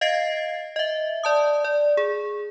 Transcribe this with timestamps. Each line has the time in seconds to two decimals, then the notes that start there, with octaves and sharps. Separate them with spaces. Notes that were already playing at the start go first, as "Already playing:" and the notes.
0.01 D#5 F5 G#6 A6 C7 D7
0.76 D#5 E5
1.24 D5 A5 D#6
1.64 D5
1.97 G#4